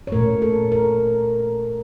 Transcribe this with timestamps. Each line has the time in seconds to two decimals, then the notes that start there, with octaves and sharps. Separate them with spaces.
0.07 C#5
0.12 A#2 A3 A#4
0.42 A4
0.72 A#4